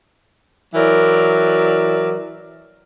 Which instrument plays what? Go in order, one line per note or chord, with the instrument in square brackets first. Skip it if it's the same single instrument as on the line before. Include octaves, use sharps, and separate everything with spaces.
[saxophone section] E3 F#3 A#4 D5